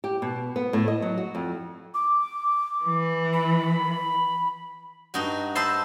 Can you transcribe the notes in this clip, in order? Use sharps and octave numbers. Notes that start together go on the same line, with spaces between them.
G4
B2
B3
A2
D#5
F#3
F#4
F2
D6
E3
B5
G2 D#4 F#4
C5 D#5 E5 A5 B5 C6